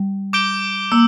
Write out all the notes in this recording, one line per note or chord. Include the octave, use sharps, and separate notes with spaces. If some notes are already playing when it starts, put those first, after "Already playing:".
Already playing: G3
D6 G6 D7 G7
A#3 E6